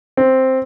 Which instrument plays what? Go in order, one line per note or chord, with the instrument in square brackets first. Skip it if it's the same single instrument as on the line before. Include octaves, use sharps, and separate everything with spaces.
[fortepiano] C4